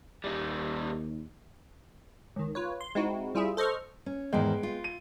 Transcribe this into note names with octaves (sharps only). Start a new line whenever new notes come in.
D#2 G3 D#4
C#2 D#3
F4 B4 C#5
C6
G#3 C4 D#4 E4 F#4
G3 E4 F4 G#4 E5
A4 C5 D#5 C#6 F6
C#4
E2 G#2 D#3 G#3 B3 G5
F4
D#7